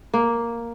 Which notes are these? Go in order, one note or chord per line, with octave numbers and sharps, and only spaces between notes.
A#3